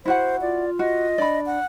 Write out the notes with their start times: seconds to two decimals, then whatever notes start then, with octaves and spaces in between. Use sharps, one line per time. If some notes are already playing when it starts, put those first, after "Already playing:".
0.05 E4 F#4 C5 F#5
0.41 F4 D5
0.79 F#4 D#5
1.18 D4 D5 B5
1.46 F#5